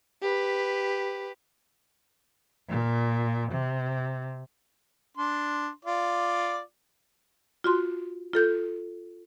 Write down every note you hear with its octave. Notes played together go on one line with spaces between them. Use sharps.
G4 B4
A#2
C3
D4 C6
F4 D5 D6
F4 F#4 C6
F4 A4 G6